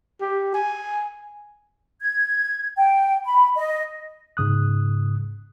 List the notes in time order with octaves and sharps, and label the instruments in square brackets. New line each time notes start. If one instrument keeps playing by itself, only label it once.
[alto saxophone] G4
G#5
[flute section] G#6
G5
B5
D#5
[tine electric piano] G#2 C#3 D#6 F#6